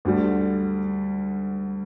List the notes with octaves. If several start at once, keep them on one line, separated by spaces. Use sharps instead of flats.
D2 D3 G3